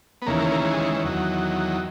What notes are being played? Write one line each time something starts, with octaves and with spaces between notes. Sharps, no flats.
B3
D#2 C#3 E3 A#3
A#3
A#3
G#3
E2 D#3 F#3